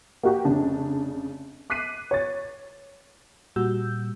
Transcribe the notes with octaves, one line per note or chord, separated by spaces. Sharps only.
A#3 F#4 G4
F1 C#3 D4
D6 F#6 B6 C7 D#7
C#5 A6
A#2 G3 F#4 E6 G6